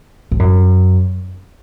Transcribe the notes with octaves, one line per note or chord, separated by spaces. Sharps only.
A2
F#2